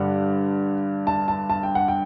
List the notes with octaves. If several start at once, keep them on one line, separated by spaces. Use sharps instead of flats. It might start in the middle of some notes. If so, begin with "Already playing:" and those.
Already playing: G2 D3 G3 D4 F#5
A5
A5
A5
G5
F#5
G5